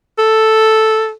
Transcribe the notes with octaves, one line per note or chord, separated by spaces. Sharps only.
A4